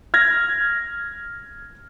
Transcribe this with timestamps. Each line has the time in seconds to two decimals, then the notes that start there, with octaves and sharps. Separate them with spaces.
0.14 F6 G#6 A#6